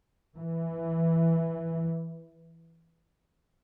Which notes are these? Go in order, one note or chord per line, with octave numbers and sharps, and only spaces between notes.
E3